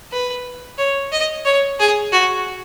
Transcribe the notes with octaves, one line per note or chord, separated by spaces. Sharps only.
B4
C#5
D#5
C#5
G#4
F#4